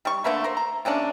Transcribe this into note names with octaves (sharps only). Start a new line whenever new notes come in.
G3 C#6
D3 A3 A#3 B4
A#4 C5
A#5
C3 A#3 C#4 D4